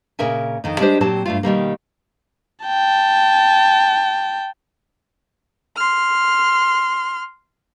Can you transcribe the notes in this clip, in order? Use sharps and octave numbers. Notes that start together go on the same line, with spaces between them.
A#2 C#3 A#4 E5 G#5
F2 D#3 D#4
G3 G#3 D4 D#4 G4 C5
A#2 F#3 C4 G4 A5
G2 A3 F4
B2 D#3 G3 A#3
G5 A5
C6 F6